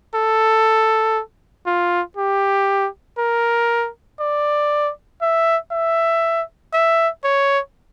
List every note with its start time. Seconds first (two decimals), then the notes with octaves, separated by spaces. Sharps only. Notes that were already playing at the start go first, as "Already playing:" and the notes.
0.15 A4
1.66 F4
2.17 G4
3.18 A#4
4.20 D5
5.22 E5
5.71 E5
6.73 E5
7.24 C#5